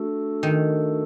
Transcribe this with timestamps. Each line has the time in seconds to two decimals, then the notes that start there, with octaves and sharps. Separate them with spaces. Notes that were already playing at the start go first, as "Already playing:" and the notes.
Already playing: A3 D4 F#4 A4
0.43 D#3